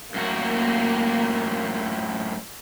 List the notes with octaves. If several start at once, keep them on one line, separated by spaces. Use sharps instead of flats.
F#2 A2 A#3 F#4